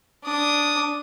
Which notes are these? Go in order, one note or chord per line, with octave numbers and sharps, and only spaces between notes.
D4 D#6